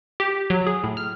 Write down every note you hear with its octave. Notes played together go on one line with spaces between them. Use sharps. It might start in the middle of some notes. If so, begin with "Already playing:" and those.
G4
F#3
G#4
A2
F6